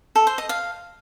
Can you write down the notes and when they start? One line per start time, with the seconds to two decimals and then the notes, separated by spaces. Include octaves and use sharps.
0.16 A4
0.27 C5
0.38 D#5
0.49 F5